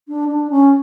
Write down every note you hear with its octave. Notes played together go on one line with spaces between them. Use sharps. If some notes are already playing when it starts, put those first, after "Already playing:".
D4
D4
C#4